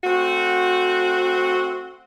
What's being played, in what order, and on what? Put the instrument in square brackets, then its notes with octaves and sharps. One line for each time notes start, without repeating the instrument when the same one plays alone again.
[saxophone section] A3 C4 F#4